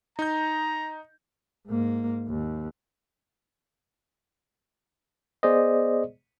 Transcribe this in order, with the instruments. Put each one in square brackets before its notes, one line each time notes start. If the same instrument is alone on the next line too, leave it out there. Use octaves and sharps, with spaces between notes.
[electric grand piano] D#4 G6 [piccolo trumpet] A#5
[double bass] G#2 A#3
D#2
[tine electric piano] B3 G#4 C5 D5 D#5